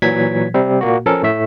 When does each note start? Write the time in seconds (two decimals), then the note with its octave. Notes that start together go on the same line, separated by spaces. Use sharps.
0.02 A#2 E3 F#3 G#6 B6
0.54 C3 G3 C4
0.81 A#2 A#3 F#4
1.06 F3 C#4 A4 A#4
1.23 A2 A3 E5